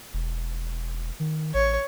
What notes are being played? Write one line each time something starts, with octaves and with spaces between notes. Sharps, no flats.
E1
D#3
A1 C#5